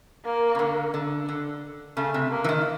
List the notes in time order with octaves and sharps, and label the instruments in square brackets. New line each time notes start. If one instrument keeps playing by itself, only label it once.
[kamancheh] A#3
[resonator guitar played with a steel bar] C#3
D3
D3
D3
[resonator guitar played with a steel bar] C#3 [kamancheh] A3
[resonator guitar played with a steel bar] C3
[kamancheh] A#3
[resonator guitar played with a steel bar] E3
D#3